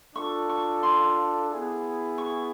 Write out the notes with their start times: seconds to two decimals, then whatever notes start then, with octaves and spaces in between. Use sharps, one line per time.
0.15 D4 F4 A4 C#6
0.49 C#6
0.83 C6
1.50 B3 E4 G#4
2.18 C#6